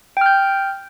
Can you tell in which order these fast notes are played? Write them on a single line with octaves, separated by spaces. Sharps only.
G5 F6 G6